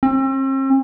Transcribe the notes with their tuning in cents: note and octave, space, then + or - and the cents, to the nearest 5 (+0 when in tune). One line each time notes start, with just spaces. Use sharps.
C4 +45